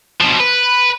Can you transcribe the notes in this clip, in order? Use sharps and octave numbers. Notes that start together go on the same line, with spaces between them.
B2 F3
B4